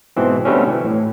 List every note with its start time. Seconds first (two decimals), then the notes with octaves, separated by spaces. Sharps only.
0.17 G#2 B2 E3 C4
0.45 B2 D3 G3 A3 C4 C#4
0.68 E3
0.85 A2